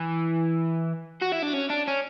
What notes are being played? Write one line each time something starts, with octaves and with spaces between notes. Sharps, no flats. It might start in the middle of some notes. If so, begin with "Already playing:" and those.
Already playing: E3
F#4
E4
D4
C#4
D4
C#4